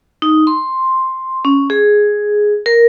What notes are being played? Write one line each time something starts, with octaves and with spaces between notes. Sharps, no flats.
D#4
C6
C#4
G#4
A#4